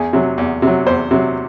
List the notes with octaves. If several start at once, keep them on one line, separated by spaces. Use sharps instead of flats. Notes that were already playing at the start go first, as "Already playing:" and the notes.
Already playing: E2 G#4
C3 F#3
E2
C3 F#3
E2 C5
C3 F#3